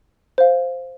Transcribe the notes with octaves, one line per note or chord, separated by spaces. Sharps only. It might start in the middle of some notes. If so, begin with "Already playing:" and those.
C5 F5